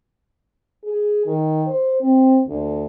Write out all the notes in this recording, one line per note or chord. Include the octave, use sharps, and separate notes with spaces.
G#4
D#3
C5
C4
D2